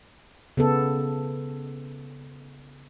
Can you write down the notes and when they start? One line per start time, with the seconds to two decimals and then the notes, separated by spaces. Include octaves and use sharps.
0.57 C#3 B3 A4